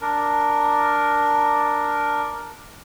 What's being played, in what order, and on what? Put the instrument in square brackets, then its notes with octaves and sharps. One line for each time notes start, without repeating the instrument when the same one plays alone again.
[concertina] D4 A#4